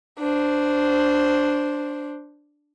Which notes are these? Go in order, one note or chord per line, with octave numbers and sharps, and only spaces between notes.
D4 C5